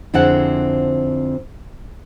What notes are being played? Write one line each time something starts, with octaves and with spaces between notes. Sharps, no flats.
F2 D3 C4 E4 G#4 F#5